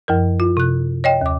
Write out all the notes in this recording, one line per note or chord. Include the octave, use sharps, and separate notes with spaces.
F#2 F3 A#4
F4
C3 F#6
C#5 D#5 G5
D#2 D6